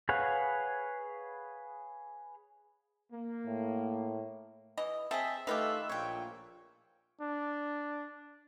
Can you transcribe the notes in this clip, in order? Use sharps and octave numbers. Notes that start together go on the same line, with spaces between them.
G#4 B4 C#5 F5 F#5
A#3
A2
E3 D#5
C4 G#4 D#5 E5 A5
D#3 A3 F4 G4 B4 F5
A#1 A#2 C#5 G5
D4